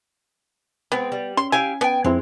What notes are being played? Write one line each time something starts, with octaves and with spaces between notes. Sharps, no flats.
G#3 B3 C4
G3
C#4 C6
E4 G4 F5 G#5
B3 G5 G#5
F2 G#3 C4 E4